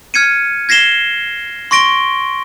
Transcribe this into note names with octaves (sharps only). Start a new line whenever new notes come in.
F6 G#6 C#7 D#7
G#6 A#6 C7 E7 G7
C6 C#6 A#6 D7 G7